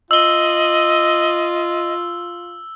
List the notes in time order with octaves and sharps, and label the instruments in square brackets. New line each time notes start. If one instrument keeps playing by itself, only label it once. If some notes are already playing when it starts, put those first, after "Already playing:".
[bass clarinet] F4 [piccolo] D#5 [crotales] E6 G7